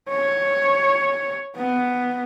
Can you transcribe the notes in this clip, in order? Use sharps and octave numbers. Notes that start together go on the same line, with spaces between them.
C#5
B3